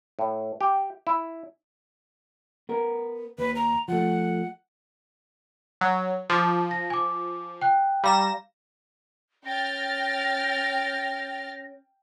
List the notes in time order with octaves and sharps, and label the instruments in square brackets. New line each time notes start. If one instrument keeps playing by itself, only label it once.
[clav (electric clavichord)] A2
G4
E4
[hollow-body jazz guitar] B3 A#4
[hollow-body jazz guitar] D#2 [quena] B4
[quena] A#5
[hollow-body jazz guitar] F3 A3 [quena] F#5
[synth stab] F#3
[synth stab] F3 [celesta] C6 D6
[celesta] A#6
G#5 D6
G5 F#6
[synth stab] G3 A#6 E7 [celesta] F5 A#5
[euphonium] C#4 [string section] G5 F6 A6 [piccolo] A#6